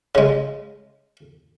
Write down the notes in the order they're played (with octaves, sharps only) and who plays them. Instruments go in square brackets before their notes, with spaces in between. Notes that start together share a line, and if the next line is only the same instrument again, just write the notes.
[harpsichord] C#3 G#3